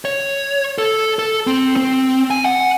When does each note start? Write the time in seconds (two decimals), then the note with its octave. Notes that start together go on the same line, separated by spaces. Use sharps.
0.05 C#5
0.78 A4
1.19 A4
1.47 C4
1.76 C4
2.31 G#5
2.45 F#5